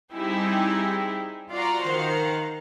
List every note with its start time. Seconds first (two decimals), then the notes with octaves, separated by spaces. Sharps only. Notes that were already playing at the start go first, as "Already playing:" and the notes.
0.13 G3 C4 D#4 E4 G4 G#4
1.52 F4 F#4 D5 F#5 A#5 C6
1.84 D#3 C5 F5 F#5